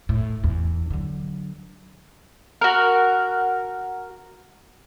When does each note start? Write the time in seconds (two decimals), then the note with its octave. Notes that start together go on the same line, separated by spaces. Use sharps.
0.09 A2
0.44 E2
0.90 D3 F#3
2.61 F#4 A#4